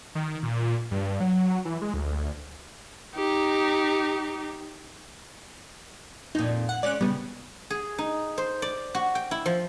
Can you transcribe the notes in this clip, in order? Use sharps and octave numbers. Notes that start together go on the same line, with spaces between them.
D#3
A#2
G2
F#3
E3
G#3
D2
D#4 G4
F2 A#2 D#4
F#5
G#3 C#4 D5 F#6
C#3 G3 B3
G#4
D#4
C5
D5
F#4
G5
E4
F3